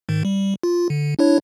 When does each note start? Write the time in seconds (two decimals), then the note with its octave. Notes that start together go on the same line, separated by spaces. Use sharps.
0.09 G#2 D#3
0.25 G3
0.63 F4
0.90 D3
1.19 D4 E4 C#5